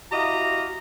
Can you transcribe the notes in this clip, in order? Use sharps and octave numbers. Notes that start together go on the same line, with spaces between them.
E4 F#4 G4 D#5 F5 A#5